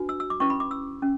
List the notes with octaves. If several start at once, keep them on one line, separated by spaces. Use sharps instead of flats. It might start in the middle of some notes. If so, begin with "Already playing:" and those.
Already playing: D4 F#4 B4
E6
E6
D6
C#4 E4 B4 C#6
B5
D6
E6
C#4